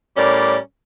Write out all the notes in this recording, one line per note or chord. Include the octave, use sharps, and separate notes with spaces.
A2 G3 C#4 A#4 D5